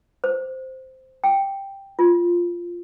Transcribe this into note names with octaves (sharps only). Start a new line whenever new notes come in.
C5
G5
F4